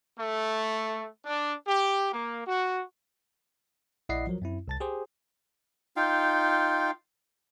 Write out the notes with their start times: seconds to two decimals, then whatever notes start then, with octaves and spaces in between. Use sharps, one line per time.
0.18 A3
1.25 D4
1.67 G4
2.12 A#3
2.47 F#4
4.09 A#1 E4 D5 D#5 F#5 C7
4.27 F3 F#3 A#4
4.42 F#2 C4 E4
4.68 C2 A5 A6
4.80 G4 G#4 C5
5.96 D#4 F4 F5 G5